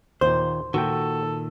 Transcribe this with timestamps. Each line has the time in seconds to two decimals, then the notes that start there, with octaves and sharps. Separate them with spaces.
0.21 D#2 A#2 C5
0.74 A#2 D#3 F#4 A4 G5